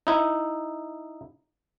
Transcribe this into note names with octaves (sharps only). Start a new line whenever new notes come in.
D#4 E4